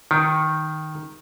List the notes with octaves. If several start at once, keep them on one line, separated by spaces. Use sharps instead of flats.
D#3